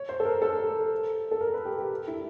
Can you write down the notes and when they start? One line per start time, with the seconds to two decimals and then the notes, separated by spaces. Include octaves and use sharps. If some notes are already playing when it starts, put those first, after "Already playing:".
Already playing: C#5
0.09 C5
0.20 A4
0.25 A#4
0.42 A4
1.31 A4
1.41 A#4
1.54 B4
1.65 G4
1.78 G4
2.07 E4